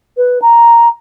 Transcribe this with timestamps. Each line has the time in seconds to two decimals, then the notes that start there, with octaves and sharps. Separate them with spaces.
0.17 B4
0.42 A#5